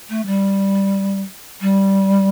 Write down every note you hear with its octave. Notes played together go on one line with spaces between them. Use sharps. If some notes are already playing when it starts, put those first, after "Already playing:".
A3
G3
G3